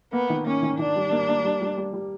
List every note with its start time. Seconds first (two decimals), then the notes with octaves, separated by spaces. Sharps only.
0.12 A#3 B3
0.30 D#3
0.46 A#3 C#4
0.62 D#3
0.79 D#3 D4
0.96 G3
1.12 A#3
1.29 A#3
1.44 G3
1.61 G3
1.77 G3
1.93 G3